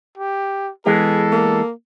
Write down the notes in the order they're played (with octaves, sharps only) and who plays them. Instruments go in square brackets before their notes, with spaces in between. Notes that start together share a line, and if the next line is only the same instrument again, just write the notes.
[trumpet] G4
[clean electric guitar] E3 G#3 B3 [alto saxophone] G#4 [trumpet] A4
[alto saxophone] A#3